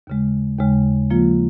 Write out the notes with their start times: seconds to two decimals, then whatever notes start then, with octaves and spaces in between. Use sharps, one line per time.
0.07 D#2 C#3 G#3
0.58 D#2 C#3 G#3
1.10 F3 A#3 F4